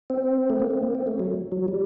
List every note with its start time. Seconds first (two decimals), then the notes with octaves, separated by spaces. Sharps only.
0.10 C4
0.50 A3
0.60 A#3
0.70 C4
0.83 A#3
0.95 C4
1.07 A3
1.20 F#3
1.52 F#3
1.68 G3